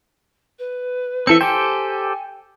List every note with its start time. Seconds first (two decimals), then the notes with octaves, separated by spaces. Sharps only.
0.59 B4
1.27 E3 C4 A4 E5 C#7
1.41 G4 A4 C5 G5 G#5